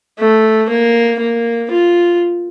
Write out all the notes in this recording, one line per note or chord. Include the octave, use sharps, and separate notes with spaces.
A3
A#3
A#3
F4